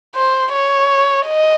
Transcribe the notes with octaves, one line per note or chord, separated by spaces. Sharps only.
C5
C#5
D#5